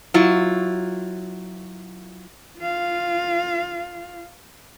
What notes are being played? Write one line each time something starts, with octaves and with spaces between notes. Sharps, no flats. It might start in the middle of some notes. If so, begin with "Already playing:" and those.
F#3 E4 F4
F4 F5